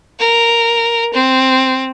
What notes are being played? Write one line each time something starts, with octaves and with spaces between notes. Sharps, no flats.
A#4
C4